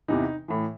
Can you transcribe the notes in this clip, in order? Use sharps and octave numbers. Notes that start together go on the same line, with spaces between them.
E2 C3 E3 D#4
A2 E3